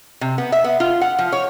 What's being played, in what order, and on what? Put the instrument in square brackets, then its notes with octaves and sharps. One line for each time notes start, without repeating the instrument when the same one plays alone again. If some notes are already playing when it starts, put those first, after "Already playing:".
[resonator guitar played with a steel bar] C3
B3
E5
B3
F4
F#5
F3
C#5